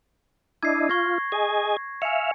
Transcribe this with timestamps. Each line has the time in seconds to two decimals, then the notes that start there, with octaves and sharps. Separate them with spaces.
0.63 D4 E4 D#5 G#6 C7
0.90 F4 C#6 G#6 A#6
1.32 G#4 D#5 G#5
2.02 E5 F5 G#5 C#7